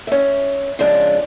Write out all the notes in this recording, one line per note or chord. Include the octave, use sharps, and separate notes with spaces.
C#4 E5
C#3 F3 G#3 C4 D4